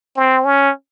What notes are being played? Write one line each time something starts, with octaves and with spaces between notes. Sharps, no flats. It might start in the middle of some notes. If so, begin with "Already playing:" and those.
C4
C#4